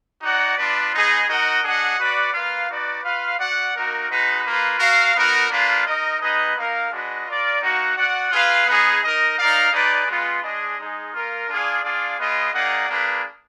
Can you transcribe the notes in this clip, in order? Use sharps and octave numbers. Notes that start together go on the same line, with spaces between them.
D#4 F#4 D5 F#5
B3 D4 F4 B4 D5
B3 D#4 G#4 D#5
D#4 F#4 A#4 D#5 F#5
D4 G#4 D#5 F#5
F#4 B4 D5 F#5
A#3 F4 B4 F5
D#4 F#4 B4 D5
F4 B4 F5
F#4 D5 F#5
A#3 D#4 F#4 A#4
G#3 D#4 F#4 B4
A#3 F4 B4
F#4 A#4 F5
B3 D#4 F#4 A#4
A#3 D4 F4 B4 F5
D#4 A#4 D#5
B3 D#4 G#4 B4 D#5
A#3 D#4 A#4 F5
G#3 D4 F#4 B4 D#5
F4 A#4 D5
A#3 D#4 F#4
F#4 D5 F#5
F4 G#4 B4 F5
B3 D#4 G#4
D#4 A#4 D#5
D#4 A#4 D5 F5
D#4 G#4 B4 D5
G#3 B3 F4 B4
G#3 D4 G#4 D#5
G#3 D#4 G#4
A#3 F4 A#4
D4 F4 G#4 D5 F5
D4 F4 G#4 D5 F5
B3 F4 G#4 D#5
A#3 D#4 G#4 D5 F#5
A#3 D4 G#4 B4